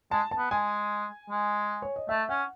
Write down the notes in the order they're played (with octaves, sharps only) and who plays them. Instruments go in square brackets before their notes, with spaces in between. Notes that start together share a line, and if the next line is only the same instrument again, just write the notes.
[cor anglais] G#3 [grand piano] A5
[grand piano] A5
[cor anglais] B3
[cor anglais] G#3 [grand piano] G#5
[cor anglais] G#3
[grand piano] C#5
D#5
[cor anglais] A3 [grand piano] E5
[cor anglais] C#4 [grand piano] F#5